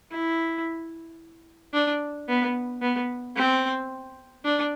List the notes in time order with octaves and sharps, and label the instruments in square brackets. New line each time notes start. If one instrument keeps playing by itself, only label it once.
[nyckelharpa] E4
D4
B3
B3
C4
D4